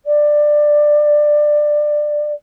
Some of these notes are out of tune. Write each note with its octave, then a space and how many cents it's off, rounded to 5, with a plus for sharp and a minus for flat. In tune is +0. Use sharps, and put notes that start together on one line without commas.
D5 +15